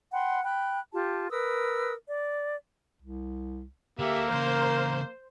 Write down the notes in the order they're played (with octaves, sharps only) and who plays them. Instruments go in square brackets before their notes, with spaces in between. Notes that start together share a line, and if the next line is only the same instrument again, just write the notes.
[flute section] F#5 G5 B5 C6
G5 B5 F#6
F4 G4 A5
A#4 B4 D#6 E6
D5
[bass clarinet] C2
[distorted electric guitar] D3 A3 [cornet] A#3 [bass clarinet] G4 [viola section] E5
[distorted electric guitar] E2 C#3 [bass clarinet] A#4 [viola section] C5